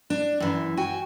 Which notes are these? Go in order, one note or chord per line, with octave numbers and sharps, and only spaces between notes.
D4
F#2 E3
F#4 G5 G#5